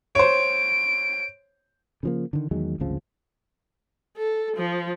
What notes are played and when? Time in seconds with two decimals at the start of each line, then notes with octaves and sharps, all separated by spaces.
0.15 C5 C#5 D7
2.03 C#3 F3 A#3
2.33 D3 D#3
2.51 E2 D#3 F#3 G#3
2.80 G#1 D2 C#3 F3
4.17 A4
4.56 F3